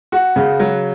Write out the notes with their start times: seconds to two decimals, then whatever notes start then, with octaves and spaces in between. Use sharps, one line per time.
0.12 F#4
0.36 C#3
0.60 F#3